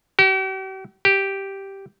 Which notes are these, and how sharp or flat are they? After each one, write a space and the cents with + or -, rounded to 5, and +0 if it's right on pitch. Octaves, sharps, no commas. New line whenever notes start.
G4 -45
G4 -5